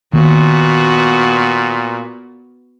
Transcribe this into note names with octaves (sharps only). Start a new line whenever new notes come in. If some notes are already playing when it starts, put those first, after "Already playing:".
A#2 D#3 A#3 B3 F#4